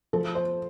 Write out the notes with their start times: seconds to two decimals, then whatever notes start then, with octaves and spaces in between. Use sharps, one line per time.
0.13 F3 A4
0.35 C5